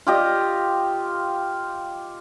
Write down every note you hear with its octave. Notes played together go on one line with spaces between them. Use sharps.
F4 G4 D#5